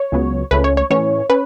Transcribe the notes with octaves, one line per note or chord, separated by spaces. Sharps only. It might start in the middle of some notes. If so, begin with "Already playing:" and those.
Already playing: C#5
C#2 C#3 F#3 B3
C#2 C#3 A3 C#4 B4
C#5
C#5
A2 E3 C#4 C#5
C#4 B4